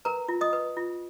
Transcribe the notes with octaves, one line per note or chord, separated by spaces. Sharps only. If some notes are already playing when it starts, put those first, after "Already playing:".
A#4 B4 A#5
F4
D#5 D#6
B4
F4